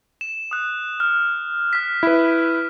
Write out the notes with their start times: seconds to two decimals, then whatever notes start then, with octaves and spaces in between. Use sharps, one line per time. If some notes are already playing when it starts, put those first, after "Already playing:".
0.21 E7
0.51 D#6 F#6
1.00 F6
1.73 F6 B6
2.03 E4 B4